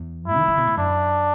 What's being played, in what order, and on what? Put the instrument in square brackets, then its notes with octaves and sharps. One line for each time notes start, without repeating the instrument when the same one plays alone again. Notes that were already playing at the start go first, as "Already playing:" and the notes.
Already playing: [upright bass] E2
[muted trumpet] E4
[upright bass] E3
D3
B2
A2
[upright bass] F#2 [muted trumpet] D4